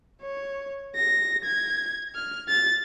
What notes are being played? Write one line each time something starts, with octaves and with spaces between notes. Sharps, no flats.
C#5
A#6
G#6
F6
A6